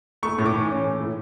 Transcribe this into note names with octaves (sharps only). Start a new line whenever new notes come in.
A3 C#6
A2
D6
E3
C#4
A3
A2